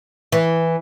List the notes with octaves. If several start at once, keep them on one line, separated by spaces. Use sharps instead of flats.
E3